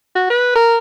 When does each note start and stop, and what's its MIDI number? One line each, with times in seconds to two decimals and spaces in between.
0.15 0.26 66
0.30 0.53 71
0.56 0.78 70